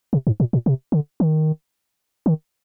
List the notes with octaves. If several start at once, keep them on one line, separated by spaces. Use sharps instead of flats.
C3
G#2
A#2
A#2
C3
D3
D#3
D#3